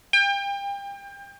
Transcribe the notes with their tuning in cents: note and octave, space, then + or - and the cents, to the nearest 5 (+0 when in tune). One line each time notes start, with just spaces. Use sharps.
G5 +30